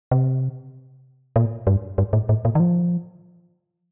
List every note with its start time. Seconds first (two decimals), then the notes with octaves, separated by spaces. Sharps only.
0.11 C3
1.36 A#2
1.67 G2
1.98 G2
2.13 A2
2.29 A2
2.45 A#2
2.55 D#3
2.60 F3